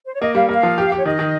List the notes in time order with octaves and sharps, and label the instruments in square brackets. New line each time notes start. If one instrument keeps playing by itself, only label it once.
[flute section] C5
C#5
[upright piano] A#3 [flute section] D#5
[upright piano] G3 [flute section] F5
[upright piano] A#3 [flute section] F5
[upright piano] F3
G4
G4
[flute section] C#5
[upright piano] D#3 [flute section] D#5
[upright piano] D#3